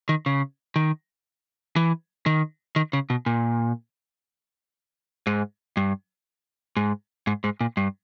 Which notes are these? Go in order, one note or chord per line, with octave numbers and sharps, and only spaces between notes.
D#3
C#3
D#3
E3
D#3
D#3
C#3
B2
A#2
G#2
G2
G#2
G#2
G#2
A#2
G2